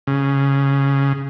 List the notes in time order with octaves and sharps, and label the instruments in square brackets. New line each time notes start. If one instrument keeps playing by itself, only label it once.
[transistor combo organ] C#3